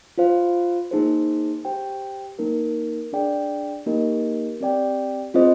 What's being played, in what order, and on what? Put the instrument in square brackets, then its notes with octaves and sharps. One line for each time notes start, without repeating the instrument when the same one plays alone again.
[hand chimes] F4 C5 F5
A#3 D#4 G#4 C5
G4 C5 G5
A#3 D#4 A#4
D4 G#4 D5 G5
A#3 D#4 G4 A#4 D#5
C4 G4 D5 G5
C4 F4 G#4 C5 D#5